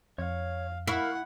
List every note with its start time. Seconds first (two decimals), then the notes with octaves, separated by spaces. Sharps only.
0.18 F2 C#5 F5
0.88 E4 A#4 F5 F#5 C#6